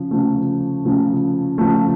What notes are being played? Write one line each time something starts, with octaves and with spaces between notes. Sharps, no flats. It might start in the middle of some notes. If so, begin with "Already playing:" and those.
Already playing: C#3 F3
C#3 F3 A3
C#3 F3 A3
C#3 F3 A3